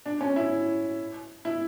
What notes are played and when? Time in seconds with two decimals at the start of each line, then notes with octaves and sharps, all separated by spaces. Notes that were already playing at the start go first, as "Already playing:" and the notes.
0.06 D4
0.21 C#4
0.36 E4
1.45 E4